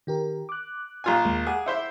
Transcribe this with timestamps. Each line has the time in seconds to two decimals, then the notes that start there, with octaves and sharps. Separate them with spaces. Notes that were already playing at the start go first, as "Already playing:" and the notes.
0.07 D#3 G4 A#4
0.49 D6 F#6
1.04 A#1 F4 G#5
1.25 D#2 G#3 A#3
1.47 G#4 F#5 D6
1.66 E4 C5 E5